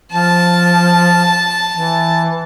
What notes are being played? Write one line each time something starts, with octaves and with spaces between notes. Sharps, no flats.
F3 A5
E3